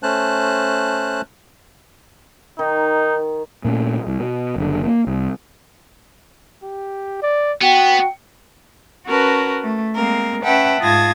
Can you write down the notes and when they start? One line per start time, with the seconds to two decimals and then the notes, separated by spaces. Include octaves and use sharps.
0.03 A3 C#4 C5 A5 F#6
2.59 D#3 D#4
3.65 A#2 A3 C#4
4.07 C2
4.20 B2
4.56 F#1 D3
4.85 A#3
5.07 C2
6.63 G4
7.22 D5
7.62 B3 F#4 G5
9.06 C#4 F#4 A#4 B4 A5
9.62 A3
9.93 G#3 A#3 C4 A#4
10.42 C#4 B4 E5 F#5 G5 A5
10.80 G#2 F4 A5 D#6 G#6 A#6